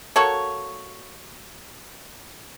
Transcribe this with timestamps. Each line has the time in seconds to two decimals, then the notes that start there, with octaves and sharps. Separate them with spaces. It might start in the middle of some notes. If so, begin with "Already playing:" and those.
0.16 A#3 F#4 A4 C#5